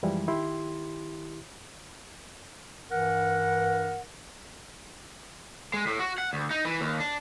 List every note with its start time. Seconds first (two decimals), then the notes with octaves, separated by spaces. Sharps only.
0.03 F#2 E3 F3 G3 G#3 E4
0.28 D#3 E4 G4 C6
2.90 G2 E3 A#4 F#5
5.74 G#3
5.87 A2
5.99 F#4
6.18 F#5
6.33 D2
6.51 D#4
6.65 E3
6.81 D#2
7.00 D4